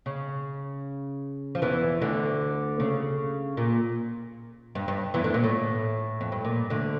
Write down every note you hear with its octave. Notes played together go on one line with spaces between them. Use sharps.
C#3
F3
E2 E3
D2 D3
C#3
A#2
G2
G2
E2 E3
D2 D3
A#2
A2
F2
G2
A#2
D2 D3